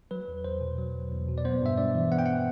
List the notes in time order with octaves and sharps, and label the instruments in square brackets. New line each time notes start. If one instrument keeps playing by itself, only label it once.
[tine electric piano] F#3 B4
E2
E2 C5
B2
F#3
E2
E2
B2
D5
B3 C5
G2 E5
G2 D5
E3
B3 F#5
G5
F#5